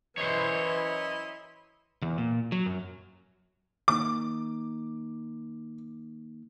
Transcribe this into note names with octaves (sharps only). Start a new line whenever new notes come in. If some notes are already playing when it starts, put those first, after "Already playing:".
F#2 E3 E4 C5 C#5 D#5
E2
A#2
F#3
F#2
D#3 A#3 D#4 D6